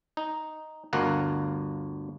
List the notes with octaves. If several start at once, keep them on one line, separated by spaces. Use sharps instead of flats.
D#4
G1 D2 A#4 F5 F#5